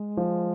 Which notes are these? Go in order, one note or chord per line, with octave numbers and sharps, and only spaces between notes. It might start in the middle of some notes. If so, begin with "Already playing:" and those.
Already playing: G#3
F3